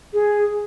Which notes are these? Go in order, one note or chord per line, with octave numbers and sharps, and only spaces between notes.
G#4